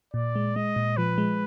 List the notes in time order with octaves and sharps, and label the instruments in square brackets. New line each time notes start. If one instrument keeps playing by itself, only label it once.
[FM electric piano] A#2 [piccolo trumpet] D5
[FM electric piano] G#3
[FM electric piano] G#3 [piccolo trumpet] D#5
[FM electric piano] A#2
[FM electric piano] F3 [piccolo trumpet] B4
[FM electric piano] G#3